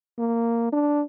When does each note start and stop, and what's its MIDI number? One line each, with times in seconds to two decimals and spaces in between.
0.19 0.68 58
0.73 1.02 62